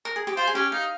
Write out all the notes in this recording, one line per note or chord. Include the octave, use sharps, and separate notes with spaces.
A#4
G#4
G4
F4 C5
G#4
C#4 G4
D#4 F5